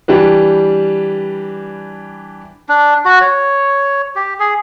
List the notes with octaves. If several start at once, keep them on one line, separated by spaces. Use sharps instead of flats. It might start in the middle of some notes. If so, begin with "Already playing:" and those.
E3 G3 D4 G4 B4
D4
F#4
C#5
G4
G#4